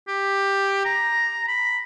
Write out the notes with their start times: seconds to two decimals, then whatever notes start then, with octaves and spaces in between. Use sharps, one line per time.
0.08 G4
0.85 A#5
1.48 B5